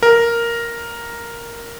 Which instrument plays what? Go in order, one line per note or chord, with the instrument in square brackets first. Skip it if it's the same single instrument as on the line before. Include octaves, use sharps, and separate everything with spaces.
[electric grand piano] A#4